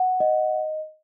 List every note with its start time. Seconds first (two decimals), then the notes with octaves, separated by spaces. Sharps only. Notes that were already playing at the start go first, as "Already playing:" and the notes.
Already playing: F#5
0.20 D#5